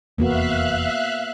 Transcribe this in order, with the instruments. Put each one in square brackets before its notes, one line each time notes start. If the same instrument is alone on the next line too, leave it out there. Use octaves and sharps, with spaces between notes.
[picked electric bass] F1 E2 [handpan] A#3 B3 F#4 [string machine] E5 F5 F#6